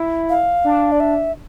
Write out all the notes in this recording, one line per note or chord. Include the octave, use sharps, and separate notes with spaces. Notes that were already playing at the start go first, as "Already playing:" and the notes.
Already playing: E4
F5
D4
D5
E5